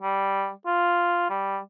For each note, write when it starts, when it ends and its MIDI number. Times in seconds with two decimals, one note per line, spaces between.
0.02 0.50 55
0.66 1.27 65
1.30 1.59 55